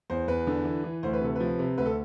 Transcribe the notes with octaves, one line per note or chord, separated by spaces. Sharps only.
E2 C5
E2 B4
D3
E3
E3
D2 C5
B4
C3 A4
F3 B4
C3
D2 B4
A4